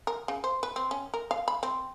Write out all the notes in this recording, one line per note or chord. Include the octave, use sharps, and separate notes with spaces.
A#4
C#3
C5
B4
C4
C#4
A#4
F5
B5
C4